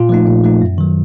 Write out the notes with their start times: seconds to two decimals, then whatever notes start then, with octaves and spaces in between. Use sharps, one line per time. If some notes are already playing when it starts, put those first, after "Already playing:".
Already playing: A#2 F4
0.09 F3 A3 D#4
0.27 A#2
0.43 F3 A3 D#4
0.61 F#2
0.78 D#3 F#3